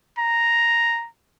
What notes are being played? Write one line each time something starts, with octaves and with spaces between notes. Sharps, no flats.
A#5